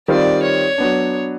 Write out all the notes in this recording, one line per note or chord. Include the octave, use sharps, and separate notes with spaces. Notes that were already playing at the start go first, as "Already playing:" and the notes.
D#3 G3 C4 F4 D5
C#5
F#3 B3 D4